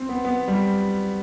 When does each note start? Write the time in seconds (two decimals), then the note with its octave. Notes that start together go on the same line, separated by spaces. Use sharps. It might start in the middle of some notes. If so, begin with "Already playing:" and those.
Already playing: C4
0.09 B3
0.25 B3
0.48 G3